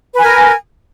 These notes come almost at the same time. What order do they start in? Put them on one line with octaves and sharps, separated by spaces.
B4 G#5 A#4